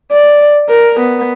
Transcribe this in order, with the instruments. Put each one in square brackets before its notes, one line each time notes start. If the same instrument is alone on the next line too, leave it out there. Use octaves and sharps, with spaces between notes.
[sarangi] D5
A#4
B3